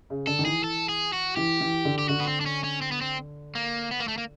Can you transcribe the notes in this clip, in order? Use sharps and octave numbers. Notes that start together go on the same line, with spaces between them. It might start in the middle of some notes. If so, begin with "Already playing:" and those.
C#3
D3 A4
D#3
E3 G#4
A4
G#4
F#4
E3 G4
E3
D3
G4
D3 F#4
B3
C4
D4
C#4
C#4
C4
B3
C4
A#3
B3
A#3
A3
A#3